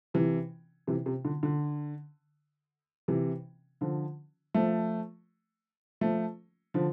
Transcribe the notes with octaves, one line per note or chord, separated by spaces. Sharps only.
C3 E3
C3 E3
C3
D3
D3
C3 E3
D3 F3
F3 A3
F3 A3
D3 F3